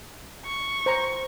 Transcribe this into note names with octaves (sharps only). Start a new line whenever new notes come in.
C#6
C5 G#5 A#5